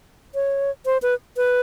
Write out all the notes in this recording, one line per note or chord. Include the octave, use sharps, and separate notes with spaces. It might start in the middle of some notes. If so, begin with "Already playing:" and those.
C#5
C5
B4
B4